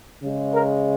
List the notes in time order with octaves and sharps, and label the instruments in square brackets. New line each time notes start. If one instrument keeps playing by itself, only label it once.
[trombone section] C#3 G#3
A#4